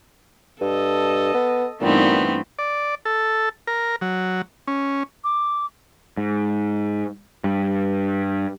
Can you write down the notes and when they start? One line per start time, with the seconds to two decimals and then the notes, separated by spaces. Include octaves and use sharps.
0.61 G2 A4 D#5
1.34 B3
1.81 G2 A#2 E3 A3 B3 C4 D#4
2.59 D5
3.05 A4
3.67 A#4
4.01 F#3
4.67 C#4
5.24 D6
6.17 G#2
7.44 G2